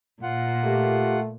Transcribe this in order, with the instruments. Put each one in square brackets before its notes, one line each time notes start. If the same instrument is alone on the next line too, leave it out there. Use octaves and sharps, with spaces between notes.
[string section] A#2 [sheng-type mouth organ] F4 F#5
[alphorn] A3 [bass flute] G4